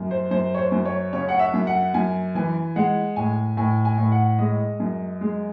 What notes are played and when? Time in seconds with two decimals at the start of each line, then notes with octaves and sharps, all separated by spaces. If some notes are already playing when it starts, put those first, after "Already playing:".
Already playing: F#2
0.11 C5
0.31 F#2 C5
0.54 C#5
0.58 C5
0.72 F#2
0.85 C#5
1.13 C#3 C#5
1.29 F#5
1.39 E5
1.53 F#2
1.67 F#5
1.94 F#2 G#5
2.35 E3 G#5
2.76 G#3 F#5
3.16 A2 G#5
3.57 A2 G#5
3.85 G#5
3.98 A2
4.12 F#5
4.39 G#3 D#5
4.80 F#2
5.21 G#3